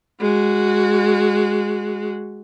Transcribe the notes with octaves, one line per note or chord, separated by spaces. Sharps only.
G#3 F#4